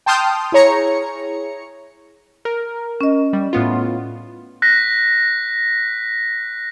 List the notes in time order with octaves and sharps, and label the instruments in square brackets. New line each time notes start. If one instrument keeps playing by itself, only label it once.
[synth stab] G5 A5 C6 D#6 F6 G6
E4 G#4 C#5 A#5 C#7
[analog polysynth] A#4
[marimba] C#4 D#5
[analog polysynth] G3
A2 B3 F4
[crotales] F#6 A#6 B6